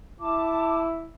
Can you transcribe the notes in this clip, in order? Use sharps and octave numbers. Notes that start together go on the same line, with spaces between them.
E4 A5 D6